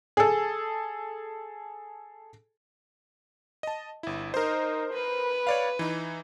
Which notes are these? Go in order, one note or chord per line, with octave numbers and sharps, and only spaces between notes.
G#4 A4
D#5 A5
G1 E4
D#4 A#4 C5
B4
C#5 D5 F5
E3 D#4